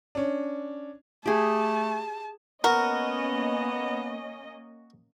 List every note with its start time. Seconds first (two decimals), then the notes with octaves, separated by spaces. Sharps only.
0.15 C#4 D4
1.26 A3 G4 G#4 A5
2.64 A#3 B3 C#4 F#4 A#4 D#5